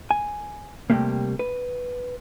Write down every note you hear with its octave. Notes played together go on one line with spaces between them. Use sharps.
G#5
C3 G3 A3 A#3
B4